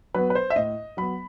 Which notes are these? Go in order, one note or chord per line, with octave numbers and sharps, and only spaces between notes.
F#3 B3 B4
B4
C5
E5
A2 D#5
F#3 B3 B5